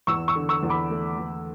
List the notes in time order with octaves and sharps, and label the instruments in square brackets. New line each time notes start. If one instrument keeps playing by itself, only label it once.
[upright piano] E2 [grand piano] C#6 E6
[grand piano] C#6 E6
[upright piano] D3
[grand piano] C#6 E6
[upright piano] E2
[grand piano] B5 D6
[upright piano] A3
E2